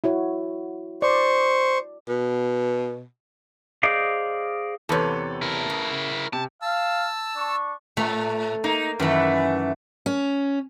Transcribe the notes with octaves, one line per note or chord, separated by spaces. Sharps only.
E4 F#4 C#5
C5 D5 C#6
B2
G#4 C5 D5 D#5 F5
E2 C3 A4 B4 C#5
E4 A#4
C#3
C3 A5
F5 A5 E6
D4 C#6
A2 A3
A#3 D#4
F#2 D#3 E3 A3 B4
C#4